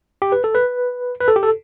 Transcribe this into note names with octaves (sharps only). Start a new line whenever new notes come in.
G4
B4
A4
B4
B4
A4
G4
A4